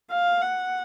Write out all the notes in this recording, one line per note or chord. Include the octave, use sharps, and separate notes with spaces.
F5
F#5